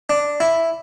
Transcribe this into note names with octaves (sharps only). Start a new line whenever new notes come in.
D4
E4